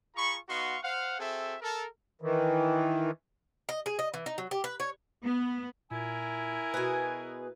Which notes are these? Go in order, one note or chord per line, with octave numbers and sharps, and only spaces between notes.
F4 G#4 A#5 B5 C#6
B3 D#4 F#4 F5 C6 C#6
C5 F5 F#5
C4 F#4 G#4 A4 E5
A4 A#4
D#3 E3
D#5
G#4
D#5
E3
D#4
F#3
G4
B4
C#5
B3
A#2 E4 A#4 G#5
B2 G#4 B4